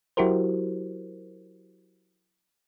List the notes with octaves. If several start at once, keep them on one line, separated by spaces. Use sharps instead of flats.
F#3 E4 F#4 G4 A#4 C5